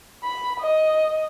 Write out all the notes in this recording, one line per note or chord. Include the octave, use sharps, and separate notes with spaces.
B5
D#5